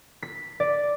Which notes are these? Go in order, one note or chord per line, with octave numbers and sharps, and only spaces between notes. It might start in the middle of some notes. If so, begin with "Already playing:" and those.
B6
D5